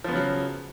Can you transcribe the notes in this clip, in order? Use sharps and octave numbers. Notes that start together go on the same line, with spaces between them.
C#3 F3 F#3 B3